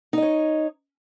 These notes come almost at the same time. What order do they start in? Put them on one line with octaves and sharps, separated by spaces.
D#4 D#5 C#5